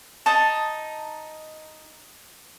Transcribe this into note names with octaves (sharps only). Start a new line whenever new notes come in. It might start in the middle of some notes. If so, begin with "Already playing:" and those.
D#4 A5